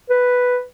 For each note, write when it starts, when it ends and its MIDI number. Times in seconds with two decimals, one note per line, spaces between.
0.10 0.59 71